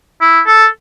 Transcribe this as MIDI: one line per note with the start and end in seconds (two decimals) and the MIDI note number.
0.21 0.41 64
0.46 0.66 69